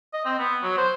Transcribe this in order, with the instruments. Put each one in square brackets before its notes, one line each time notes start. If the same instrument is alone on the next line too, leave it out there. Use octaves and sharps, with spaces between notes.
[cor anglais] D#5
C4
B3
F#3
C5